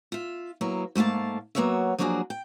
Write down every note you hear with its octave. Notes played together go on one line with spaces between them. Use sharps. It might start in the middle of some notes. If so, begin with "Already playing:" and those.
F4 E5
F#3 A#3 B3 E4
G#2 A3 A#3 F5 A5
F#3 A#3 B3 F#4 C#5 E5
F3 F#3 A#3 D4 F#4 G#4
G5